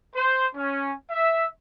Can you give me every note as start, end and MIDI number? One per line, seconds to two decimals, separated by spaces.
0.16 0.47 72
0.56 0.93 61
1.11 1.47 76